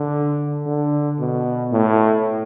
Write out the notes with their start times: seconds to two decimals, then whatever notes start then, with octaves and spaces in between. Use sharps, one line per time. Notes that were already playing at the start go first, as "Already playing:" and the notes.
Already playing: D3
0.66 D3
1.19 B2
1.72 A2